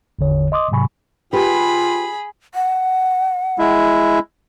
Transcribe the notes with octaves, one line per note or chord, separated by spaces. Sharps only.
G#1 E2 D3 C#5
D#5 C6 D6 D#6
G#2 C3 F#3 G#5 B5 C#6
F4 G4 G#4 B4 B5
F#5
G#3 E4